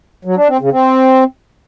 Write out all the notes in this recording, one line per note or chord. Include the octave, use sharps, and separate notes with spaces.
F#3
D4
C4
C#3
C4